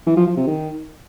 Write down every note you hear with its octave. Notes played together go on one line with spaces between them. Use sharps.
E3
F3
F3
C3
D#3